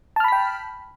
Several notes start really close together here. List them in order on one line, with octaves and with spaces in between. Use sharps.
A5 F6 B5 B6 G5